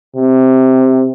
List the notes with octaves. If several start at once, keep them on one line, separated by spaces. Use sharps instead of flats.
C3